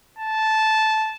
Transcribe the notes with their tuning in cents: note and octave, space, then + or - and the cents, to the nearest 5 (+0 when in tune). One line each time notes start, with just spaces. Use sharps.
A5 -10